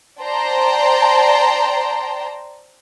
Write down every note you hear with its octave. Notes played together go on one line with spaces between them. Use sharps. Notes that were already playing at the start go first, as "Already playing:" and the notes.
C5 D5 G5 A5 A#5 C6